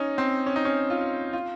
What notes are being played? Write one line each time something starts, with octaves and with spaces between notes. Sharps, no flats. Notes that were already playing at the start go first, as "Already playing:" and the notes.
Already playing: C#4 D#4
C4
C#4
D#4
C#4
F4
F4